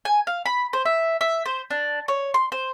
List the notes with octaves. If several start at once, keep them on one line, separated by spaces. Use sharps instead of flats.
G#5
F5
B5
C5
E5
E5
C5
D4
C#5
C6
C5